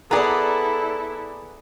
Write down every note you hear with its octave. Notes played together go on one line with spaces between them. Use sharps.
B3 E4 G#4 A4 D5 A#5